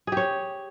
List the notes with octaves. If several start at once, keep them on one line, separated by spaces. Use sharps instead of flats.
G4 G#4 C#5